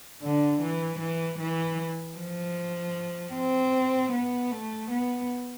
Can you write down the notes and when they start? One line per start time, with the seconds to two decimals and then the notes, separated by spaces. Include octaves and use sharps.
0.22 D3
0.61 E3
1.00 E3
1.39 E3
2.17 F3
3.34 C4
4.12 B3
4.51 A3
4.91 B3